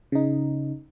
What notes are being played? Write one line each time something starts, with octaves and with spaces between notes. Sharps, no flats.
C#3 D#4